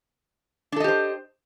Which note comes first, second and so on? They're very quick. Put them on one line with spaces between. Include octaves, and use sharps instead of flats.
D4 A4 D#5 G4 C5